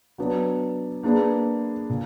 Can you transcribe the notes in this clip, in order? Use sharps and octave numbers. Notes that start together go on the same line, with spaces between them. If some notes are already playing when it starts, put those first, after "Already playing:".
F#3 B3 D4
A#3 D4 G#4 B4
A#2